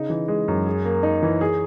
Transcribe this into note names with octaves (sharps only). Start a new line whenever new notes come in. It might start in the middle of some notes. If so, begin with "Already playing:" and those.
Already playing: C#3 D#4
E3
G#3
F#2
G#4
A#3
D#4
E3
G#4